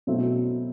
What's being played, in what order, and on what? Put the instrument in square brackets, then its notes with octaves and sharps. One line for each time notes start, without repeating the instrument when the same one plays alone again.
[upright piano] B2 F#3 A3 C4 E4